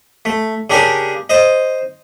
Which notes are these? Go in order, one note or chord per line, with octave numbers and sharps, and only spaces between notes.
A3
C#3 D4 G4 A#4
C5 D#5